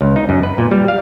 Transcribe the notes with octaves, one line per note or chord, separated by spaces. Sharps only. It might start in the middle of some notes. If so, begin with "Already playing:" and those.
C#2
D#4
F#2
B4
A#2
G3
F5